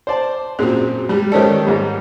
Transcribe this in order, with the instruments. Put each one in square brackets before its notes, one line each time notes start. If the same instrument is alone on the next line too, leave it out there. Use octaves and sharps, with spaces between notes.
[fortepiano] C5 D5 A5
[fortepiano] F#2 A#2 C4 [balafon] F#4 G#4
[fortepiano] G3 [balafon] G#3 G4
[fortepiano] D#3 C#4 A4 [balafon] G#3 C5 D5
[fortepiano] G#2 G3